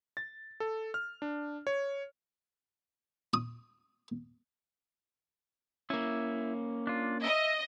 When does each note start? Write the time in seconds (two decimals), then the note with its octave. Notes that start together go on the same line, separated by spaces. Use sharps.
0.17 A6
0.60 A4
0.94 F6
1.22 D4
1.67 C#5
3.34 D#6
5.90 A#3 C#4 E4
6.87 D4 F4
7.24 D#5 E5